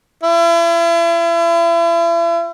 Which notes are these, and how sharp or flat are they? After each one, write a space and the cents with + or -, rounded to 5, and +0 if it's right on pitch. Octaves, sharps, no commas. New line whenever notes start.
E4 +40